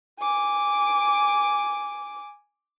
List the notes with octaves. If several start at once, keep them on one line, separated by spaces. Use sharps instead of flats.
G#5 D6